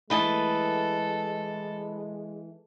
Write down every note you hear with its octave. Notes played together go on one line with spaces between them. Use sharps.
E3 G#3 A3 E4 A4 B4 D#5 A5